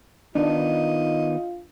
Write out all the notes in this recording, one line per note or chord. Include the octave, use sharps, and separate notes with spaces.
D#3 B3 D4 D#4 F4 D#5